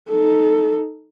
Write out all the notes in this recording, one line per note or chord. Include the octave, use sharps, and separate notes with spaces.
D#4 A4